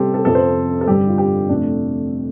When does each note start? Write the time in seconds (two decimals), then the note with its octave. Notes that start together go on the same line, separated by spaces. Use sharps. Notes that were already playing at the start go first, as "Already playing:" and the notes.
Already playing: C3 G3 G4 A4 C5
0.14 A4
0.25 F2 C3 F3 A4
0.35 C5
0.81 A4
0.87 G2 D3 G3 G4
1.07 F4
1.18 G4
1.49 F2 C3 A3 D4